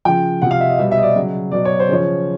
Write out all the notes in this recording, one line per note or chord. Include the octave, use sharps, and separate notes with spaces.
C#3 F3 G5
C3 F3 F#5
F5
E5
D#5
B2 G3 E5
E5
D#5
D5
C#3 F#3
B2 F#3 D5
C#5
C5
C#3 F3 C#5